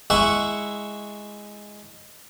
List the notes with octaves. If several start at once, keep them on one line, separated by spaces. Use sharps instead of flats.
G#3 E4 E5 F#5 C#6